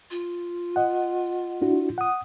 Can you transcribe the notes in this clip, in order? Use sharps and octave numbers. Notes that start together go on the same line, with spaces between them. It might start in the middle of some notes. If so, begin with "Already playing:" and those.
F4
D#5 F#5
D4 E4 F#4
F#5 D#6